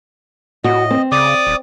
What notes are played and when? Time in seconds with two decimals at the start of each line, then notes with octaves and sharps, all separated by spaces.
0.64 A2 F#4 D#5
0.91 C4
1.12 C#3 D5 D6 D#6
1.47 D#1